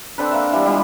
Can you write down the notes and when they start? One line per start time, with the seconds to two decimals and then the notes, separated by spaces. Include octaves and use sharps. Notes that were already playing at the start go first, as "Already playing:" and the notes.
0.18 C4 D4 A4 B4
0.32 A#3 E5
0.53 E3 G3 B3
0.66 G3 G#3 B3 F4